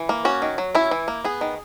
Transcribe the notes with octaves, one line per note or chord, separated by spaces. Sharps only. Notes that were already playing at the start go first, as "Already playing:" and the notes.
Already playing: E3
A#3
C#4 F#4
D#3
F#3
C#4 E4
E3
A#3
B3 G#4
D#3